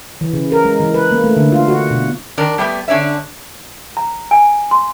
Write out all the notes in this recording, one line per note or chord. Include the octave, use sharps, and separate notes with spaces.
E3
C#3
A#4
G#3
E3
B4
A#3
A3
D3
F4
F#4
B2
D#3 D4 A#4
G3 A3 B3 G4
D3 C#4 D4 C#5 E5
A#5
G#5
C6